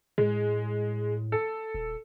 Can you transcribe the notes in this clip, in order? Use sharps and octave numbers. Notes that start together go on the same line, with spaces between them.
A2 G#3
A4
D#1